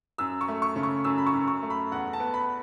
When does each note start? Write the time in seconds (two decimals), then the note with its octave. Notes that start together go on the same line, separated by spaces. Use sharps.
0.18 F#2 E6
0.41 C#6
0.48 A3
0.62 C#6
0.76 C#3
0.83 C#6
1.04 F#2 E6
1.18 B5
1.27 C#6
1.33 F#2
1.48 C#6
1.63 A3
1.70 B5
1.92 E2 F#5
2.13 A5
2.20 B3
2.34 B5